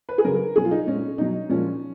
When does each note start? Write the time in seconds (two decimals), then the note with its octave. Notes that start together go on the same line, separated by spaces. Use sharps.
0.09 B4
0.18 G#4
0.24 C#3 F#3 A#4
0.56 B2 F#3 G#4
0.65 F4
0.71 D#4
0.87 A#2 G#3 C#4
1.18 B2 F#3 D#4
1.49 A#2 F3 G#3 C#4